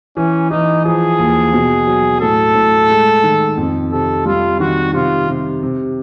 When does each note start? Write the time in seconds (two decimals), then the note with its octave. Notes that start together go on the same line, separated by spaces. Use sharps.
0.17 E3 C#4
0.51 E3 D#4
0.85 F3 G#4
1.19 D#2
1.53 B2
1.87 F#3
2.21 A2 A4
2.55 A2
2.90 G#3
3.24 D#3
3.58 F2
3.92 C3 A4
4.25 G3 F4
4.60 D#3 F#4
4.93 C3 F4
5.28 C3
5.63 C3